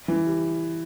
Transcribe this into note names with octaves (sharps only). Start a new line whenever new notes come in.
E3
G3